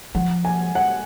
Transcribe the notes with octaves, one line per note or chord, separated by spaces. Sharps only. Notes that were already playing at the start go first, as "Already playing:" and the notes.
F3 F#5
G#5
F#5